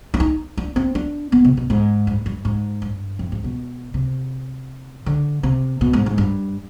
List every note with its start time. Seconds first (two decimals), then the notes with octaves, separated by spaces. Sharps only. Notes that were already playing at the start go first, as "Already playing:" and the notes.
0.14 D4
0.20 D#4
0.57 D4
0.76 C4
0.95 D4
1.32 B3
1.45 C3
1.57 B2
1.70 G#2
2.07 G2
2.26 G2
2.45 G#2
2.82 G2
3.19 F2
3.32 G#2
3.44 B2
3.94 C3
5.06 D3
5.43 C3
5.81 B2
5.93 G#2
6.06 G#2
6.18 G2